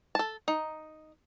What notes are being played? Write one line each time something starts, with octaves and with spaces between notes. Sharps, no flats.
A4 A5
D#4